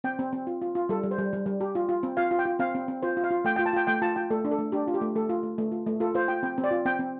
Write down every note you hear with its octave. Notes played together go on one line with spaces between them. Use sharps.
C4 G5
C4
C4
F4
F4
F4
G3 A4
G3
C5
G3
G3
G3
G4
F4
F4
C4
F4 F5
F4
G5
F4
C4 F5
C4
C4
F4 C5
F4
F5
F4
A3 G5
G5
F4
A5
F4 G5
A3 G5
F4 A5
F4 G5
A3 A4
D4
A4
A3
D4 G4
F4
G4
A3
A3 A4
F4
A3
A3
F4
A3
F4 A4
F4 C5
F4 G5
C4 G5
C4
D5
F4
C4 G5
C4